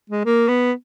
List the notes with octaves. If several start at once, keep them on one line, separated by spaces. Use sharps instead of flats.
G#3
A#3
B3